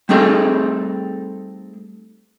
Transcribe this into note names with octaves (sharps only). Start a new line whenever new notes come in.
G3 A3 C4 D#4 G#4 A4